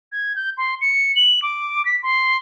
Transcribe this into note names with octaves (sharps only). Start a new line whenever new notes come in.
G#6
G6
C6
C#7
F#7
D6
B6
C6